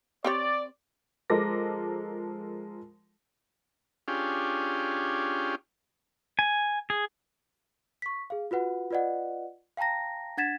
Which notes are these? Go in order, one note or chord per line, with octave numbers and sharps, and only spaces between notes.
C4 G4 C#5 D5
F3 G#3 A4 A#4 D6 A#6
C#4 D4 F4 G4 G#4
G#5
G#4
C#6 B6
G#4 F5
F4 F#4 B4 F#5
F4 B4 D5 D#5 F#5
F5 G5 A5 A#5 A#6
D4 F#5 G#6 A6 B6 E7